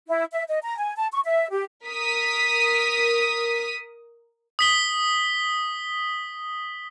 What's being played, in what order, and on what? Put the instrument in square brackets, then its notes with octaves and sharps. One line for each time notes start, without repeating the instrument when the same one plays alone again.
[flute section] E4
E5
D#5
A#5
G#5
A5
C#6
E5
G4
[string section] A#4 D#6 B6
[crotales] D#6 B6 G7